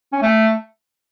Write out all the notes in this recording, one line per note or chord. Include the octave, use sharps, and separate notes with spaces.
C#4
A3